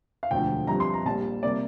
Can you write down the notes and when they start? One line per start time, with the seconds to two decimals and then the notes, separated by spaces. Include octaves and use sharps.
0.23 F5
0.31 E1 D2 D3 F3 G5
0.67 G2 F3 C4 A#5
0.80 C6
0.94 A#5
1.05 A#1 A#2 G3 A5
1.43 C3 G3 A#3 D5